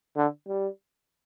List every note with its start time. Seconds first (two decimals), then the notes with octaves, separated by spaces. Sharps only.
0.16 D3
0.48 G3